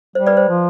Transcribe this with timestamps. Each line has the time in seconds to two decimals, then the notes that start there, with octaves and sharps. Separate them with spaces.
0.15 G3 C5
0.27 B4 D5
0.37 C5
0.49 F3